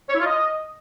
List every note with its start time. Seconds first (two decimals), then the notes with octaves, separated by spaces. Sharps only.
0.10 C#5
0.15 E4
0.20 F4
0.26 D#5